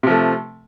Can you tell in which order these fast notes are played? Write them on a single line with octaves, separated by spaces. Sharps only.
C3 F3 A3